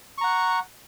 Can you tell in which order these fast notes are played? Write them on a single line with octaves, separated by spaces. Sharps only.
C#6 A#5 F#5